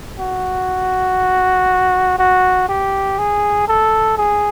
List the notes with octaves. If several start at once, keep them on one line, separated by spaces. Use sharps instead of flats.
F#4
F#4
G4
G#4
A4
G#4